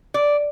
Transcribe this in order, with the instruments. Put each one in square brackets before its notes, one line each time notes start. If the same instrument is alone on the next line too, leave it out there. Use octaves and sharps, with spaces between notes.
[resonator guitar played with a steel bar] D5